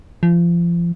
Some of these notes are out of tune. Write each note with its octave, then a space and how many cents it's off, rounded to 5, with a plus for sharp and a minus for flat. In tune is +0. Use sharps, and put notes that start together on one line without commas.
F3 -30